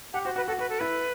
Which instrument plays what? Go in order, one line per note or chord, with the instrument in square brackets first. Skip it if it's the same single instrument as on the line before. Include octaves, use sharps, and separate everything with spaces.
[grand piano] G4 [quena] F#5
[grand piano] F#4 [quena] C5
[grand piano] F#4 [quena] B4
[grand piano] F#4 [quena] A4
[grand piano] F#4 [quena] B4
[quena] A4
[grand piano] E4 [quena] B4